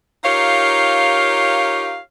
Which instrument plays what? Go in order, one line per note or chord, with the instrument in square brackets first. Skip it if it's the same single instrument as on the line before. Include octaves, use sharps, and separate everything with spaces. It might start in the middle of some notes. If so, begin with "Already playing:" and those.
[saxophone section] D#4 F4 G4 A#4 C#5 F5